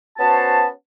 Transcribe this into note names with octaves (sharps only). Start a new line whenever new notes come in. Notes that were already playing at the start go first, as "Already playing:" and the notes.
B3 C#4 F#4 C5 A5